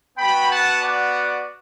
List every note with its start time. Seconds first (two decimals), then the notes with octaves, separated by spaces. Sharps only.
0.16 B3 F#4 G5 B5
0.49 F#5 A5
0.82 D5 F#5